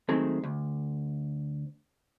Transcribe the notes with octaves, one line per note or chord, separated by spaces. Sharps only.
D#3 F#3 G#3 A3 C4
D2